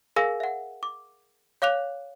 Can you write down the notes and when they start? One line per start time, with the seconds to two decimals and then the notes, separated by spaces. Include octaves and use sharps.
0.16 G#4 A#4 F5 G#5 E6 A#6
0.40 E5 F#5
0.83 D6
1.62 C#5 F5 D6 F#6 F7